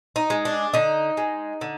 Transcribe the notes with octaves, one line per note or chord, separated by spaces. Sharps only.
D#4
G#3
D4
D3 D#4
G#3
D3